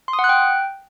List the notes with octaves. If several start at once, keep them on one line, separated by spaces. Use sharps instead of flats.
C6
D#6
F#5
F#6
G5